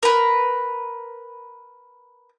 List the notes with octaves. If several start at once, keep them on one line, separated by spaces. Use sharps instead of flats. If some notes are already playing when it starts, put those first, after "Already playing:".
A#4 B4